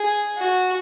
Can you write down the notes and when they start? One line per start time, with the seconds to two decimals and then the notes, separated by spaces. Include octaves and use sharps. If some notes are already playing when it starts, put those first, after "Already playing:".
Already playing: G#4
0.37 F#4